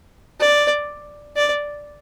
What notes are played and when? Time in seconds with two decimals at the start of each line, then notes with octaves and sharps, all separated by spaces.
0.40 D5
1.36 D5